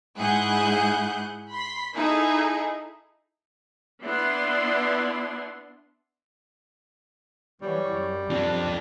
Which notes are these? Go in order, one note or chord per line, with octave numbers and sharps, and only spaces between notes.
G#2 E4 G#4 F#5 F#6 G6
B5 C6 B6
D#4 E4 G#4 A4
B3 D4 E4 C6
E3 F#3 G3 C#5
F#2
F3 C4 D4